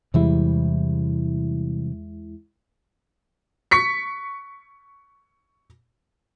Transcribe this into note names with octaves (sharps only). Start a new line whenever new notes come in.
E2 C3 E3 G3 G#3 E4
C#6 B6 C#7